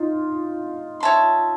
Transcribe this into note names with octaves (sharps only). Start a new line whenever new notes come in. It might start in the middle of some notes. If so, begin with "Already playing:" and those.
Already playing: D#4 F4
C#5 E5 A5 C6